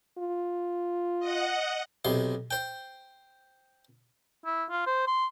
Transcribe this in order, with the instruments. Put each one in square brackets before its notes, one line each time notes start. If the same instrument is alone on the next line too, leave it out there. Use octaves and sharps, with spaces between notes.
[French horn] F4
[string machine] D#5 F#5
[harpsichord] B1 C3 C6
C5 G5
[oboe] E4
F4
C5
C6